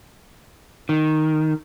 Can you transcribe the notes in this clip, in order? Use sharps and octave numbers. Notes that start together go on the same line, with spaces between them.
D#3